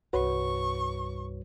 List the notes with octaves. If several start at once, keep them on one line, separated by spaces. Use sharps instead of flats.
C2 G2 F#4 B4 C#5 C#6